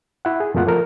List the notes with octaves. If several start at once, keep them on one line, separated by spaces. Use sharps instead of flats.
E4 F#5
G#4
F2 A#2 A3 F4 A#4 F#5
F3 A4 A#4